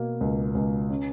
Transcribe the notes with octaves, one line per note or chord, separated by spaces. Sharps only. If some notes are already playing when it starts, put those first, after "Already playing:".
Already playing: B2 A#3
C#2
C#2
C#4